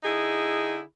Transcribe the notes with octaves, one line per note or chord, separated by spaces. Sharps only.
D3 D#4 E4 G#4